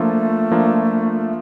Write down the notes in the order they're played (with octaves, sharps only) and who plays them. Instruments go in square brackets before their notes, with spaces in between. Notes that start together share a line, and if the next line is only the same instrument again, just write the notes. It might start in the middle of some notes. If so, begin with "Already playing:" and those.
Already playing: [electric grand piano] F3 A#3 D4 F4 [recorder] A3
[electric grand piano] F3 A#3 D4 F4